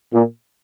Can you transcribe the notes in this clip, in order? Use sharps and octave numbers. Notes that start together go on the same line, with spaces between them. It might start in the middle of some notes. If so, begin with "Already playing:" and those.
A#2